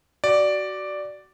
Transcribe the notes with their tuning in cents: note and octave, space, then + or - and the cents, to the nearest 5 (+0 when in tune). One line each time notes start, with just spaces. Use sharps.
F#4 +25 D5 +0